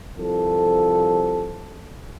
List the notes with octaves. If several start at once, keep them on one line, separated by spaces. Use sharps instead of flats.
C2 F3 A4